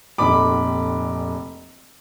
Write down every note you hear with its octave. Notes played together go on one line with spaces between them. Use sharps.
F1 A#1 A4 B5 D6